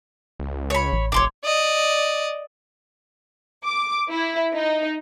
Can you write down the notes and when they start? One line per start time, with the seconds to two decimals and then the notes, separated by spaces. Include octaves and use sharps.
0.40 C#2
0.70 C#5 B5
0.93 A1
1.12 F1 C#5 C6 D6
1.44 D5 D#5
3.64 D6
4.11 E4
4.54 D#4